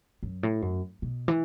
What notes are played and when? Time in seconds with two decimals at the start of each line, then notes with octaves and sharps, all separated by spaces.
0.23 F#2
0.43 A2
0.62 F#2
1.02 B2
1.28 E3